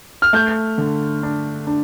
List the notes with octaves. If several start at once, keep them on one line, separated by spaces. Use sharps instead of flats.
F6
A3 G6
D3
D4
D4